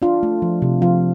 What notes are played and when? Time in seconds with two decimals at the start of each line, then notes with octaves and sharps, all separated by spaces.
0.02 D4 F4
0.23 A3
0.42 F3
0.62 C3
0.82 F3 F4